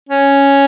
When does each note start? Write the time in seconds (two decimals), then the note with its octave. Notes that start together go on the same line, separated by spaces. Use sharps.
0.09 C#4